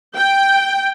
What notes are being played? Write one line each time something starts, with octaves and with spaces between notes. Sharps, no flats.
G5